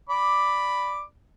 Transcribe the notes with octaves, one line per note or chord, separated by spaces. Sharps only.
D5 B5 D6